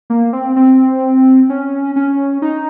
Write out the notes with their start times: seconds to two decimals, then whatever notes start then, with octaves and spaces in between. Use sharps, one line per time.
0.10 A#3
0.33 C4
0.56 C4
1.50 C#4
1.96 C#4
2.42 D#4